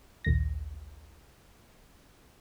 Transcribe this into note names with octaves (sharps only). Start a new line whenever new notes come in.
A#1 D#2 A#6